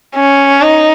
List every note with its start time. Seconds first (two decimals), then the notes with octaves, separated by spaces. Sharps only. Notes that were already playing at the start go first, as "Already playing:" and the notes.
0.15 C#4
0.62 D#4